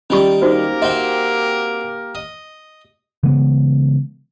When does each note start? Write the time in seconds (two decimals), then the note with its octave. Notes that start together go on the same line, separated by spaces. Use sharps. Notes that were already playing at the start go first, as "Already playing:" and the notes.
0.10 D#3 G3 C#4 F4 C#6
0.42 A#3 D#4 F#4 G4 A#4 C5
0.82 C4 F#4 E5 G5
2.15 D#5
3.23 C#3 E3 G#3 B3